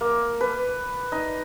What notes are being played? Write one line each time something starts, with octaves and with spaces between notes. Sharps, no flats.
A#3
B4
D#4